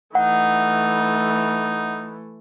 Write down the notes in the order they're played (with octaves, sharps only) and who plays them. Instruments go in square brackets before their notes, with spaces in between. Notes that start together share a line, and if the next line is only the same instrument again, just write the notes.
[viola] E3 A3 [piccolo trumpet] D#4 [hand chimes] F#5